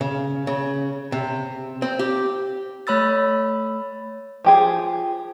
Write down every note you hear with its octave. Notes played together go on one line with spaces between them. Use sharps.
C#3
C#3
C3
C4
G4
A3 C#5 B5 E6 A6
F3 G4 G#4